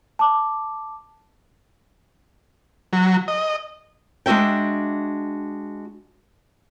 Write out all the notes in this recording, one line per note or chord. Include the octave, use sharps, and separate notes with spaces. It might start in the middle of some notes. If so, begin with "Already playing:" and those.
A5 D6
F#3
D#5
G#3 D4 F#4 E5 G5